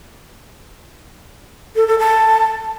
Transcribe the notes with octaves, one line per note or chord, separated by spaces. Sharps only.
A4
A4
A5